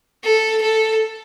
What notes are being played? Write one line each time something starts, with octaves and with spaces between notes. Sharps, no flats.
A4
A4